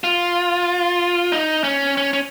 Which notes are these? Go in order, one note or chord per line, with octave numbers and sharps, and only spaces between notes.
F4
D#4
C#4
C#4
C#4